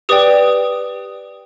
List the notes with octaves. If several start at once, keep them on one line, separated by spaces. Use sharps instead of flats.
G4 B4 D5 G5 D#6